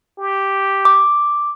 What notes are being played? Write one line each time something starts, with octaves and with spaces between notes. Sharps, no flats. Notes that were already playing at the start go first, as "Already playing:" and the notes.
G4
D6